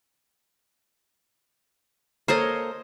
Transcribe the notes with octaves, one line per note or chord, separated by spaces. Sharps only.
A#3 A4 A#4 C5 C#5 D#5